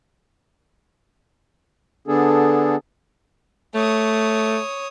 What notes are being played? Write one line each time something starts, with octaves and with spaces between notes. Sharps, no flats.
D3 B3 D4 G#4 A4
A3 C#5 D#6